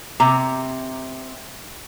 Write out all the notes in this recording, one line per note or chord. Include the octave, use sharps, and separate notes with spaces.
C3 A#5